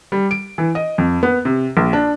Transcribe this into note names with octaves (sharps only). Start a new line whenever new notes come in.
G3
D7
E3
D#5
F2
B3
C3
A#1
D4